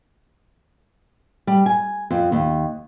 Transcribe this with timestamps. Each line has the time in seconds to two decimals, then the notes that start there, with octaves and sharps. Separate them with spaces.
1.47 G3
1.66 G#5
2.11 F2
2.32 D#2